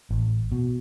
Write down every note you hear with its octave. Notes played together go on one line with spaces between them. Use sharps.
A1
B2